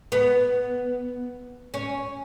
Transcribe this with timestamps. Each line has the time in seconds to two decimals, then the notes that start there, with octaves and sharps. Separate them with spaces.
0.12 B3
1.74 C#4